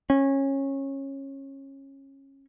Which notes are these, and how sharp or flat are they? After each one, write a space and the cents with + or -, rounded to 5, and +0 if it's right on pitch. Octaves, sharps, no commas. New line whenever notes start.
C#4 -20